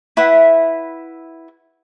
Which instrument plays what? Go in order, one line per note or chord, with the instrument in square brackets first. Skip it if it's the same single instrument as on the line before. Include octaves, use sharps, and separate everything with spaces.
[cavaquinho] E4 B4 E5 F#5